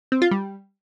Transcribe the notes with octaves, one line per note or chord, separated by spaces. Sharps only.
C4
F4
G3